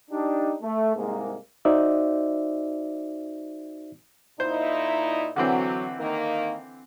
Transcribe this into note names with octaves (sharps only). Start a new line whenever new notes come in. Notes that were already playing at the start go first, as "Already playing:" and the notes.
D4 D#4 G4
A3
C2 G#2 G#3 A#3
D#4 F#4 C5 D5 E5
A#2 D#4 E4 C5
D3 E3 F#3 C4
D#3 A#3